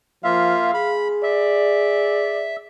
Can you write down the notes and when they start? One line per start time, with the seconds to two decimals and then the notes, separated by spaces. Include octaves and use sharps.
0.24 F3 A#3 F4 E5 F5
0.74 G#4 B5
1.23 D5 E5